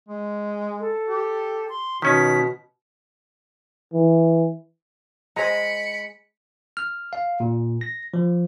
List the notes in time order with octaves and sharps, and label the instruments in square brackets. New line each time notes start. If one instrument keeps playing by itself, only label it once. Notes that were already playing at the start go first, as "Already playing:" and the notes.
[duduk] G#3
[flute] A4
[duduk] G4
[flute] C6
[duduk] B2 [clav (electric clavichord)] D#3 C#4 [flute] B6
[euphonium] E3
[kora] G#3 [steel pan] C5 G#5 A#5 [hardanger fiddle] B5 [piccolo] C#7
[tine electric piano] F6
F5
A#2
A#6
F3